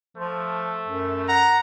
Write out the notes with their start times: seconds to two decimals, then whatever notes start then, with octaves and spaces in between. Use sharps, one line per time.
0.17 F3 A3
0.88 F#2
1.28 F#5 A#5